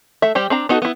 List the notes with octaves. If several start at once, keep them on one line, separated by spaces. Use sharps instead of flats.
A3 E5
G3 G4 C5
C4 D4 A#5
B3 D#4 F#4 A4
B3 E4